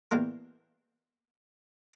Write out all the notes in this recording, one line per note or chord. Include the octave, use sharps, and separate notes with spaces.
E2 E3 G3 A#3 A#4